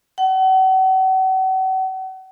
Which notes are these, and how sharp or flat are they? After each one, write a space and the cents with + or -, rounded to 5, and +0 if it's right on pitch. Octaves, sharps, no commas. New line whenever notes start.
F#5 +40